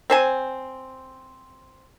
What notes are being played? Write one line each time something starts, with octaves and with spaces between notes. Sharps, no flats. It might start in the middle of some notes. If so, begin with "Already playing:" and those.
C4 C5 G#5